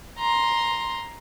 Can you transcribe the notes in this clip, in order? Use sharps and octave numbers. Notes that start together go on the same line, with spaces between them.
A#5 C6